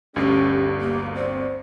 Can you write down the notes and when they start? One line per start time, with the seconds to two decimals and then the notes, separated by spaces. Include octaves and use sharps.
0.16 G1 D2 G2 A3 C#4 D4 G4
0.81 A#3
1.15 C4 C5 D5